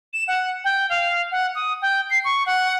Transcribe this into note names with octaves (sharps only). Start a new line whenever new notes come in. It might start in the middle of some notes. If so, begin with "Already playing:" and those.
E7
F#5
G5
F5
F#5
D#6
G5
C7
C#6
F#5